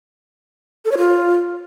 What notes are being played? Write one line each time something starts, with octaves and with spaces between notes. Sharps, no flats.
A4
C#5
F4